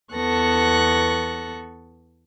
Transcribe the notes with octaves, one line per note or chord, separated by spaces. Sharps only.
E2 B3 A4 C#6 F#6 A#6